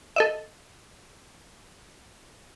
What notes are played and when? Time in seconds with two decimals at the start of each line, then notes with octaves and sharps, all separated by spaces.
0.16 A4 D#5 E5